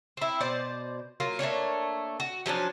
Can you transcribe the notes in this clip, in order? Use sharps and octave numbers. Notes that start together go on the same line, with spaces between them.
C4 E4
B2 C5 D5
F#3 A#3 F4
A3 A#3 D4 C#5
F#4
F3 F#3 C#4 D4